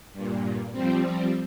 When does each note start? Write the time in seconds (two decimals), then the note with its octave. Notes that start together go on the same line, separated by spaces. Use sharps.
0.13 G2 A#2
0.72 F3 G3 C4